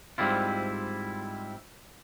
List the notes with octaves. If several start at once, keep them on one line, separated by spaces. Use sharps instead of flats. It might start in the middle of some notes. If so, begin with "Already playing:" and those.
G#2 G3 C4 E4 F4